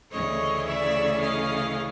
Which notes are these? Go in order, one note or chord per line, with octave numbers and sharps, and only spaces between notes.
D2 C#3 E3 A3 C#4 C#5 D#5
D5 E5
D#5 F5